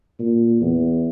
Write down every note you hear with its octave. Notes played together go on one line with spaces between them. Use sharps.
A#2
E2